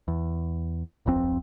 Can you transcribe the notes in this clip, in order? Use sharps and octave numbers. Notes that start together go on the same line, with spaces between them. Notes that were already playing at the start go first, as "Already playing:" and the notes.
E2
D1 G1 F2 C4